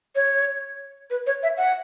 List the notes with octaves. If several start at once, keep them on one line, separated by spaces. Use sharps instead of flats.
C#5
B4
C#5
E5
F#5